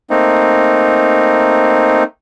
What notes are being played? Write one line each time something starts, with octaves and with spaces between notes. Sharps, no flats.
A3 A#3 C4 D#4